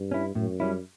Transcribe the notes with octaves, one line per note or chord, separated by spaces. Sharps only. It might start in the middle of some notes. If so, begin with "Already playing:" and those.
Already playing: G2
C#4 E4
F#2 A2
G3 C#4 E4